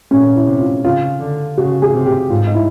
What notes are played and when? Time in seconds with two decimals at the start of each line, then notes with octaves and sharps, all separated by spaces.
0.11 A#2 C#4
0.36 E4
0.47 C3
0.60 F4
0.84 C#3 F4
1.21 D3
1.57 C#3 F#4
1.82 G#4
1.94 C3
2.06 G4
2.30 G#2 F4
2.47 D#4
2.55 E4